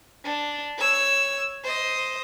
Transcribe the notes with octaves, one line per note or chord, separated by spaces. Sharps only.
D4
C#5 E6
C5 D#5